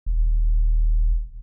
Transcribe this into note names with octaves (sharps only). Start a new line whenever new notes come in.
D#1